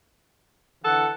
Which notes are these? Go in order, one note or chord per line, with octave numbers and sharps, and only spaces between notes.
D3 E3 A4 F#5